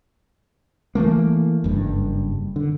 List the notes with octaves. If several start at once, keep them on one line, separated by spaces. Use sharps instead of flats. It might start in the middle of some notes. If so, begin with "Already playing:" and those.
E3 F#3 A3 A#3
F#1 G2
D3